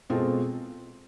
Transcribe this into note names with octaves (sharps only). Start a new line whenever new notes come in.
B2 G#3 C4 F4 A4